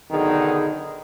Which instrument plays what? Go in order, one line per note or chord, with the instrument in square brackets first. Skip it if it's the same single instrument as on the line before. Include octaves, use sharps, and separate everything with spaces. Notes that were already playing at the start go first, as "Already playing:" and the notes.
[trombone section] B1 D3 D#3 B3 D#4 G#4